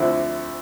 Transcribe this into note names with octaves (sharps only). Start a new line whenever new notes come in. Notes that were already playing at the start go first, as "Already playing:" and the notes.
Already playing: D2 D3 F3 C4 E4